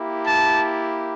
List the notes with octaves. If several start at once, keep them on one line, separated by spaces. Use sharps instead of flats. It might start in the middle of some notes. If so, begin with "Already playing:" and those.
Already playing: A#3 E4 G4
A5